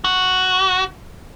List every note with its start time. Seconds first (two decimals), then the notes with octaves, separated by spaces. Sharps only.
0.04 F#4